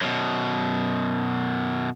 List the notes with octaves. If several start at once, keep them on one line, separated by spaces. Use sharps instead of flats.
F#2 B2